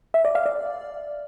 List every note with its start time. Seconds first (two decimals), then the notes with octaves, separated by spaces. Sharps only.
0.14 E5
0.25 D5
0.35 F5
0.46 D5